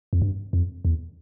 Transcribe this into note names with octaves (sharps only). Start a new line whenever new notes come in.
F2
G2
F2
E2